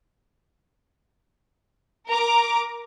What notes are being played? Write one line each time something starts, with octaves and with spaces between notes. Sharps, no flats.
A#4 A#5 D6